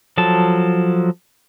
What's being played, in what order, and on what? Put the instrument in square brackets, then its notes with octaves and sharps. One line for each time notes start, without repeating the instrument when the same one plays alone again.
[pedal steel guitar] F3 F#3 A4 A5